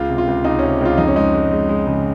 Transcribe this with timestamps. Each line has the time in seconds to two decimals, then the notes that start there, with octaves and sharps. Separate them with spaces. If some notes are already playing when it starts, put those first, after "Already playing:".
Already playing: C#2 F4
0.09 C3
0.18 F4
0.28 C#2
0.44 C#2 D#4
0.59 C3 C#4
0.81 C#2 F4
0.98 F2 D#4
1.08 C#4
1.16 G#3 D#4
1.34 G#3
1.52 G#3
1.69 G#3
1.87 C#3